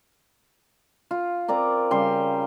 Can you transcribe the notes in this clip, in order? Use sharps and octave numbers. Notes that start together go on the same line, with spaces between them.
F4
C4 A#4 D5 A#5
C#3 G3 C6